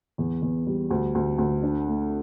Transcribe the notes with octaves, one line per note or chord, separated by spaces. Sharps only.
E2
E2
G3
D2
D2
D2
D4
A3